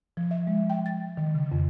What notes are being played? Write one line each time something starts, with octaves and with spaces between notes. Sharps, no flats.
F3
E5
G#3
G5
A6
D#3
C#3
F2